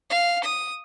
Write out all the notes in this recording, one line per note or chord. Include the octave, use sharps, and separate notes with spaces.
F5
D#6